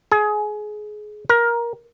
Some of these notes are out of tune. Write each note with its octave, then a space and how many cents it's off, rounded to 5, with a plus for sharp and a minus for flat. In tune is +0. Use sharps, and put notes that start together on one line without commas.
G#4 +25
A#4 +15